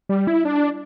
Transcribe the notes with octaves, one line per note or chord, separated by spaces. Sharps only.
G3
E4
D4